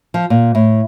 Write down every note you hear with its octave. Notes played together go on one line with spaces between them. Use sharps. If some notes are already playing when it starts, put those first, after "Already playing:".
F3
A#2
A2